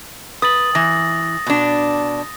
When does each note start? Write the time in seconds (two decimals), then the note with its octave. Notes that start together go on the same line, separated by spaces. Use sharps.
0.42 B4 D#6 A6 F#7
0.75 E3 A#6
1.46 B2 D4